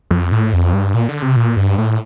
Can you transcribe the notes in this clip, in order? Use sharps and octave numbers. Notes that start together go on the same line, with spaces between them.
F2
A2
F2
G2
A#2
D3
C3
A#2
G2
A2